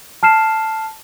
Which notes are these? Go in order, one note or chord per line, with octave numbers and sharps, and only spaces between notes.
A5 F6 C7 E7